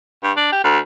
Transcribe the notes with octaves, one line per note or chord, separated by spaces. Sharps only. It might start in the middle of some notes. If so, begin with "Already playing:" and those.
G2
D4
G4
D2